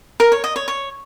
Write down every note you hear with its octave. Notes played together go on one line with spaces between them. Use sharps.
A#4
C#5
D#5
C#5
C#5